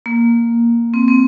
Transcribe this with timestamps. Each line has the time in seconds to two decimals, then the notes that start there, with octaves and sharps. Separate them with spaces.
0.06 A#3
0.94 C4
1.08 C4